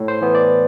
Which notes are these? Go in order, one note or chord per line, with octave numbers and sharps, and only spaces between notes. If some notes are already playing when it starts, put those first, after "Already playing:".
Already playing: A2
C5
E3 B3
D5